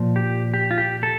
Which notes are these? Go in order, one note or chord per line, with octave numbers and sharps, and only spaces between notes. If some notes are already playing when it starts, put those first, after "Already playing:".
Already playing: A#2 F3
G4
G4
F4
G4
A4